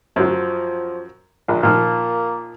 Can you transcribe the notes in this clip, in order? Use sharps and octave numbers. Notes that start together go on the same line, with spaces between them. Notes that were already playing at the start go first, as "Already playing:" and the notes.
F#2 F3 F#3
A#1 A#2
A#2 D#3 F3 A#3